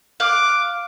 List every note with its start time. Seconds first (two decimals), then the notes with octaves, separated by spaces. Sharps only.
0.20 F5 D6 F#6